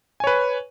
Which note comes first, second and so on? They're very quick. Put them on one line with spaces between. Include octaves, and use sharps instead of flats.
G#5 C#5 B4